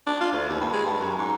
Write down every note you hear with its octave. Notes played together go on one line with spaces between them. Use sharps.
D4
F4
D2
D#2
G2
G#3
G2
F#2
G#2